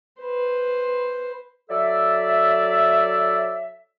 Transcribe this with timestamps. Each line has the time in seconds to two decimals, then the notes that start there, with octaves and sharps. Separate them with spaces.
0.22 B4 C5
1.70 F#3 A4 D5 E5